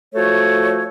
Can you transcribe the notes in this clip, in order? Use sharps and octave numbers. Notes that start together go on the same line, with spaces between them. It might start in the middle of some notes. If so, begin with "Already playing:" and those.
F3 A3 F#4 A4 C#5